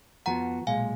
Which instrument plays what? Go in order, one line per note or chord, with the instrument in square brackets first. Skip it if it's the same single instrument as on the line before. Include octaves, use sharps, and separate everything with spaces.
[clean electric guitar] F2 F3 B3 F#4 [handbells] F#5 A#5
[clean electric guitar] B1 A#2 G#3 [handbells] F5 G#5